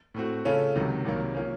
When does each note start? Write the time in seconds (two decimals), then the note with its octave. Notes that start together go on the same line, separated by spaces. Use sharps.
0.14 A2 A3 C4 F#4
0.45 C#3 A3 C#4 F4 A4
0.76 C#2 C3 D#3 F#3
1.05 C2 C3 D#3 F#3 A#3
1.35 F3 A#3 C#4